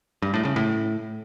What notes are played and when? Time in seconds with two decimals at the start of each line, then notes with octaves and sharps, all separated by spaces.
0.22 G2
0.34 A2
0.45 C#3
0.56 A2